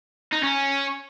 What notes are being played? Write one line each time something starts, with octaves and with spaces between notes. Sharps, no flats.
D#4
C#4